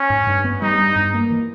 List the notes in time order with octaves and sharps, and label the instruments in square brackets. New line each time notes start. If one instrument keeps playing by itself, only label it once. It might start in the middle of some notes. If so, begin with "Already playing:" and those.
Already playing: [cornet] C#4
[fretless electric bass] G#2
G2
B3
[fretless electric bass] G3 [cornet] D#4
[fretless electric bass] G2
G2
A#3
E3